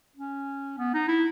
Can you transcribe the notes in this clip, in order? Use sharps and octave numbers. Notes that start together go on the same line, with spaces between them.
C#4
B3
D#4
E4